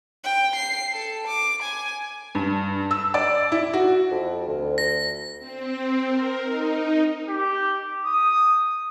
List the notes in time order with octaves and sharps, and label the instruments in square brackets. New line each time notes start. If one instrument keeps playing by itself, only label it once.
[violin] G5
C7
A4
D6
G#5
[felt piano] G2
E6
D5
E4
F#4
[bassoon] F2
D2
[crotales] A#6
[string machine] C4
A#4
D#4
[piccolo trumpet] G4
D#6